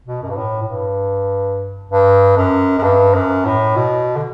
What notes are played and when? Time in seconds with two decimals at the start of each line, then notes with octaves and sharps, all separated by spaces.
0.06 B2
0.22 F#2
0.29 G2
0.37 A2
0.62 A2
0.67 G2
1.91 G2
2.37 F#2
2.78 F#2
2.83 G2
3.14 F#2
3.45 A2
3.76 B2
4.16 D3